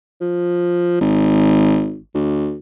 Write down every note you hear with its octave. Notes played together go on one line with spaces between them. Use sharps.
F3
G#1
D2